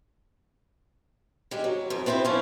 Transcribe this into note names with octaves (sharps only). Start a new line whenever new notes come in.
G3 G#3
F#3
F2
B3 C4 E4 B4 C5
E3 F3 A3 C#4